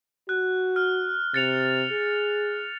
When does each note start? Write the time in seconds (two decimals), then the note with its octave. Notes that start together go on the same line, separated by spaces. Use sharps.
0.29 F#4 F#6
0.76 F6
1.34 C3 A6 C#7 F7
1.91 G#4